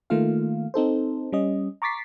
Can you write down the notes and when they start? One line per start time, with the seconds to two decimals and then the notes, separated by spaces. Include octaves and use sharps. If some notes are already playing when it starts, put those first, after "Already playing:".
0.10 D#3 A3 A#3 F4 F5
0.74 C4 D#4 A4 C5
1.32 G3 C#4 D#5
1.82 A#5 C#6 D6 A6 B6 C7